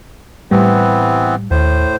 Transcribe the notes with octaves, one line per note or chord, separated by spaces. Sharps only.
A2 E3 G3 B3 C4
D#2 A2 C5